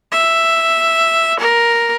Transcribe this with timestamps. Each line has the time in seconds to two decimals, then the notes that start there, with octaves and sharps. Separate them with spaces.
0.12 E5
1.39 A#4